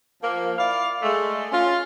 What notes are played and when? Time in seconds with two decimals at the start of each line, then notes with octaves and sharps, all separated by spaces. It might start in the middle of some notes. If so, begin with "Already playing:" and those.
0.22 F3 A#3
0.58 E4 D5 F5
1.02 G#3 A3
1.51 C#4 F4